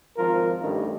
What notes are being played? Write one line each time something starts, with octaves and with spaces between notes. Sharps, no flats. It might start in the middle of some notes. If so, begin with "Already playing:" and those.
G#1 F3 F4 A#4
A1 G2 D#3